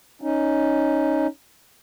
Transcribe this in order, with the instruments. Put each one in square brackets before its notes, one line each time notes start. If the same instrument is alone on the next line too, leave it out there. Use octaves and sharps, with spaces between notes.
[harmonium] C#4 D#4